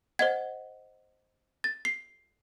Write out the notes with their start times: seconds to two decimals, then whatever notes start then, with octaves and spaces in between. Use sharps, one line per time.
0.19 C5 D#5 F#5 G#6
1.64 A6
1.85 C7